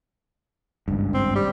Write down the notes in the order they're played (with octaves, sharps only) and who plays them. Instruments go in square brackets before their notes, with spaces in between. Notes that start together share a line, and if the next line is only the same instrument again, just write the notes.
[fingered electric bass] G#1 C#2 G2
[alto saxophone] C4
G3